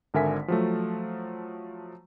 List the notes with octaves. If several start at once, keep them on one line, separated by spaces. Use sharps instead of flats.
G#1 D3 A#4 E5 G#5 B6
F3 F#3 A3